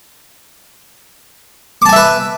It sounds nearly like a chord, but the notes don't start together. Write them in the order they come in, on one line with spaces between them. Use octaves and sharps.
D6 A5 G#5 E5 B4